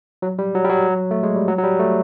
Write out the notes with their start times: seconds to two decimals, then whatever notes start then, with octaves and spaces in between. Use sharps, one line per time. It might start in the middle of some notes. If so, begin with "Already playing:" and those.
0.22 F#3
0.39 G3
0.55 F#3
0.65 G3
0.69 F#3
1.11 A3
1.23 G#3
1.36 G3
1.48 F#3
1.58 F#3
1.64 G3
1.80 A3